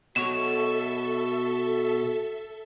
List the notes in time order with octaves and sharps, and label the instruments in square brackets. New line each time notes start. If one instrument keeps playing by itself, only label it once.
[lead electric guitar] B2 C#5 [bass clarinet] F#4 [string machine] A4 E5 [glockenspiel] E7